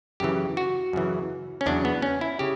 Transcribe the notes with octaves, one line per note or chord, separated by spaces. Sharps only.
F#2 C#3 E3 G4
F#4
F#2 C#3 E3
C#4
E2 C#3 F#3 D4
B3
C#4
E4
C#3 G4